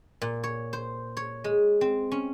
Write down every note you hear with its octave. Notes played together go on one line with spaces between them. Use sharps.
A#2
C#5
C5
C#5
G#3
C4
C#4